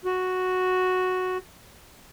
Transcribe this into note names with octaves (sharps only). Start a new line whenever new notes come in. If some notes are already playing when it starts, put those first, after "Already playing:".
F#4